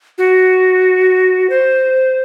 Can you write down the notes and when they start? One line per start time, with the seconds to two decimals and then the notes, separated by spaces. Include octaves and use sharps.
0.18 F#4
1.50 C5